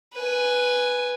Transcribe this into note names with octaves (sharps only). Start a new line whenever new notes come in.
B4 G#5